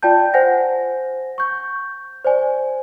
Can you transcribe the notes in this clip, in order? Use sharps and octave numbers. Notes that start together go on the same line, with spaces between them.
F4 D5 G5 A5 G6
C5 F#5 G#5 A#6
C#6 G6
C5 D5 G#5